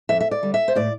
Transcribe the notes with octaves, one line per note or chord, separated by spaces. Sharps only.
F2 E5
E5
D5
D3 G3
E5
C5
A2 D5